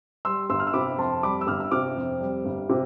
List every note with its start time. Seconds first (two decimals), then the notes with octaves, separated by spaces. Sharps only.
0.25 G3 C6 E6
0.50 G1 C6 E6
0.60 F6
0.67 E6
0.74 C3 B5 D6
0.98 F2 A5 C6
1.23 G3 B5 D6
1.41 E6
1.47 G1 D6 F6
1.60 E6
1.71 C3 D6 F6
1.96 F2
2.21 G3
2.45 G1
2.69 C3